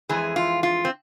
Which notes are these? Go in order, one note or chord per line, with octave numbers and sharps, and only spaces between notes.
F2 E3 G#3 G#4
F4
F4
C4